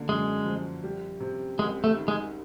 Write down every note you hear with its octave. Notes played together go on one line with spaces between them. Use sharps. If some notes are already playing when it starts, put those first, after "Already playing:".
Already playing: D3 A#3
F#2 G#3
F3
G3
C3
C2 G#3
A3
D#3
G#3